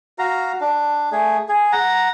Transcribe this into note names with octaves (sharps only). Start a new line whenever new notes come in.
F#4 F5 A#5
D4
A3 G#4
G#4
F#5 A#5